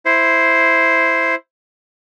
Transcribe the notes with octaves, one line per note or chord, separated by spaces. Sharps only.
E4 C5